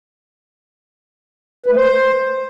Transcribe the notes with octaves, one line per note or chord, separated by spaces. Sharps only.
B4
A3
C5